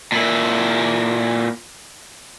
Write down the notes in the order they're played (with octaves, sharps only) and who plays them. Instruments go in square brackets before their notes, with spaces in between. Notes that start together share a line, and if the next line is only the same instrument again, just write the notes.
[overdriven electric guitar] A#2 E4